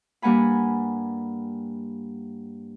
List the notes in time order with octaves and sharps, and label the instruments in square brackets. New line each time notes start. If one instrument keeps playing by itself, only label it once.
[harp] G2 G3 A#3 F#5 G#5 B5